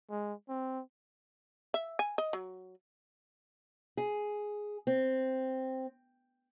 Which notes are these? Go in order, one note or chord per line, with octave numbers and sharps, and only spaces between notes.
G#3
C4
E5
G#5
D#5
F#3
G#4
C4